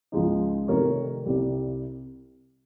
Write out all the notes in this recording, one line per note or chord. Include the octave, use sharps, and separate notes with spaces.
C#2 C#3 F3 G#3 D#4
F1 F2 C3 D#3 A#4 C#5
C2 C3 G3